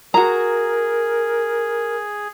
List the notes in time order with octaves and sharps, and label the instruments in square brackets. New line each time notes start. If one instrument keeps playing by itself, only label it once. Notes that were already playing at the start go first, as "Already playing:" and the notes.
[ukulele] F#4 A#5 [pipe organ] G#4 [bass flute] A#4